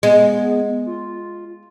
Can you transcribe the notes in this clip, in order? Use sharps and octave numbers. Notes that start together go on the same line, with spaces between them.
G#3 B3
F4